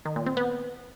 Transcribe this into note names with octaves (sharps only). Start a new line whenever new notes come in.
D#3
A#2
C4
B3